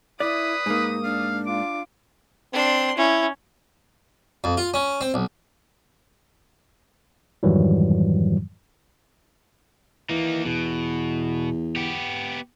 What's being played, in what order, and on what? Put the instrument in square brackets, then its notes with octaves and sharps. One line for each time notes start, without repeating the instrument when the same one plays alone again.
[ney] E4 [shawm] B4 [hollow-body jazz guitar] D5 [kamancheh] D#6
[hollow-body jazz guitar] G#2 A#3 [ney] D#4
[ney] D4 [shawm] F5
[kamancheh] F4 [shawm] D6
[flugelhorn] C4 [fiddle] D4 C6
[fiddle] C#4 [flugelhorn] E4
[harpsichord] F2
F4
C#4
C4
B1
[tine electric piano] F2 G#2 D#3 E3 F#3 G3
[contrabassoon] E3 [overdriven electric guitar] A#3 D#4
[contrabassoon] E2 [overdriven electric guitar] B2
[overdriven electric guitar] B3 G4